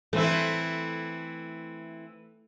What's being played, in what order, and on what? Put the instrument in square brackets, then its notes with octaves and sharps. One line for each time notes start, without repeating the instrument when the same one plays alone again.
[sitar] E3 C4 E4 [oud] A3